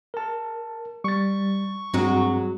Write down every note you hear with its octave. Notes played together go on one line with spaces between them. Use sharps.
A#4 A5
G3 C#6 A6
G2 F#3 G#3 C4 F#4 A#5